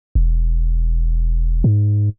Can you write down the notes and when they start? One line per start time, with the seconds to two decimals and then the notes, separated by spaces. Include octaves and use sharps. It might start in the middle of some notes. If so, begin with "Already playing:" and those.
0.15 E1
1.64 G#2